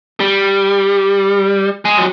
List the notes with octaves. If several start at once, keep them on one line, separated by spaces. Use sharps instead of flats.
G3
G#3
F#3